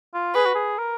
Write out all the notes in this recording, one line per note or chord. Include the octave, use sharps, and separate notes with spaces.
F4
G#4 B4
F#4
G#4
A#4